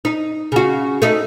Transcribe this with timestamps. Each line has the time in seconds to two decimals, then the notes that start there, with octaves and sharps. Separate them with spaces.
0.05 D#4
0.52 C#3 F#4
1.02 A3 D#4